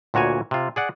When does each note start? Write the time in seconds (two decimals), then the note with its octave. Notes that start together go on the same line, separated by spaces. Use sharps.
0.14 D2 A#2 F#4 C#5 G#5
0.51 C3 F4
0.76 G#4 D5 F#5